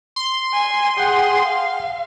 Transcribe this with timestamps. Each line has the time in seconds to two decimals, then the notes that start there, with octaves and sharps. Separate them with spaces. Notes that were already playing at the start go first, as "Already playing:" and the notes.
0.16 C6
0.53 G#5
0.97 G#4 F#5 G5
1.45 F5